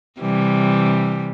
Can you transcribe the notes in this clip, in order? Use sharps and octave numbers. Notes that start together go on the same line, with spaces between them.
C3 E3 G3